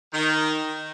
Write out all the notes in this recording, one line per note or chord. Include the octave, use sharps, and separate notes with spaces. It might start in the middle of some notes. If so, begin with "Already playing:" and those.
D#3